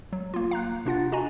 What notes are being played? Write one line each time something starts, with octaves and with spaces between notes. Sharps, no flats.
F#3
A#3 F4
F5 A#5 F#6
C3 D4 F4 F#5 A6
D4 F#4 D#5 G#5 A#5